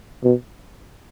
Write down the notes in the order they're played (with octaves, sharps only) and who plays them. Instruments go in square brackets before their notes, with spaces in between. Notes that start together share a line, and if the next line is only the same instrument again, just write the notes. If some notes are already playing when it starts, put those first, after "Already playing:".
[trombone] B2